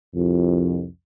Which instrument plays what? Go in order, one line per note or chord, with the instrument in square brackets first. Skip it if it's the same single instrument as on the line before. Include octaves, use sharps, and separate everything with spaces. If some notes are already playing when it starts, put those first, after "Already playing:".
[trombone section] C2 F2